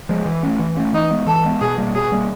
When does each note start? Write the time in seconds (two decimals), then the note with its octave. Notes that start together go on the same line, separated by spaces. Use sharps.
0.09 F3 G#3
0.26 E3
0.43 A3 C#4
0.59 E3
0.77 A3 C#4
0.93 E3 D#4
1.11 G#3 B3
1.27 E3 A4
1.44 G#3 B3
1.61 B2 G#4
1.78 G3 A#3
1.94 B2 G#4
2.12 G3 A#3